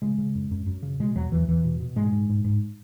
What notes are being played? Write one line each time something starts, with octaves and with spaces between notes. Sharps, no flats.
C#3 G#3
C#3
F#2
F#2
F#2
C#3
B2 G#3
E2 F#3
E2 E3
E2 E3
B2
B2
G#2 G#3
G#2
G#2
G#2